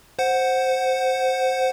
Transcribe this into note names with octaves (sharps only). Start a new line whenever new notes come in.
C5 F#5